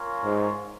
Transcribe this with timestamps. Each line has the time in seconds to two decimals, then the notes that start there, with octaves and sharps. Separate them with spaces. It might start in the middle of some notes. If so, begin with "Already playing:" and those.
Already playing: A#3 C#4 F4 A#4 C#5
0.25 G#2